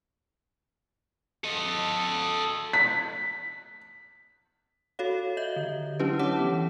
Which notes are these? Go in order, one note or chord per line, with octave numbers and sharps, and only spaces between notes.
A4 D#5
B6
F#4 A4 C#5 F5
D#5 E5 G6
D3
F#3 C#4 D4 E4 G4 B4
C#5 F#5 A5 D6
E3 B3